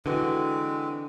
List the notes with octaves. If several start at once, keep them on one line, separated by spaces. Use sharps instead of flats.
D3 E3 G#3 C4 F#4 B4